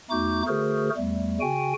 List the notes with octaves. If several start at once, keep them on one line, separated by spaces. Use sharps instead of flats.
E2 A3 D#4 F#4 D6 G6
D3 A3 F#4 G#4 A#4 C5
E2 G3 A3
C#3 F#4 G5 G#5